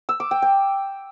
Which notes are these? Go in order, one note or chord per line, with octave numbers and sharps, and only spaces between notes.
E6
D6
G5
G5